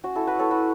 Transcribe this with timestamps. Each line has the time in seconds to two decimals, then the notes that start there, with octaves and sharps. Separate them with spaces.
0.04 C#4 F#4
0.15 E4 A4
0.27 F#4 B4
0.39 A4 C#5
0.51 F#4 B4